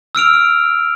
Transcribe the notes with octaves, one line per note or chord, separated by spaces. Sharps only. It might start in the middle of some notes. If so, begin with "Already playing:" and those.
E6 F6 D7 F7